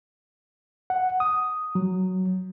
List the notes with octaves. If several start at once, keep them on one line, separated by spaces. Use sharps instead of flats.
F#5
D#6
F#3